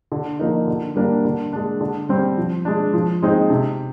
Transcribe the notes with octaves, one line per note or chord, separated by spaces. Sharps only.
D3
F3 A#3 D#4
D3
G3 A#3 D4
D3
G#3 D4
D3
G3 C4
F3
G#3 D4
F3
G#3 C4 D#4
C3